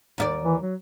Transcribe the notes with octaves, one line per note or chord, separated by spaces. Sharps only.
D#2 E4 D5
E3
F#3